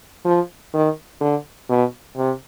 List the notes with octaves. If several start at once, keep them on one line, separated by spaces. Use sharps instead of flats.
F3
D#3
D3
B2
C3